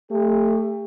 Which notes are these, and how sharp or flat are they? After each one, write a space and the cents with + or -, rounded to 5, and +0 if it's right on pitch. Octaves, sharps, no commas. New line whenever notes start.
A3 +15 G4 +40